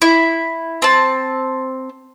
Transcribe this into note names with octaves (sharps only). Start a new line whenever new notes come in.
E4
C4 A5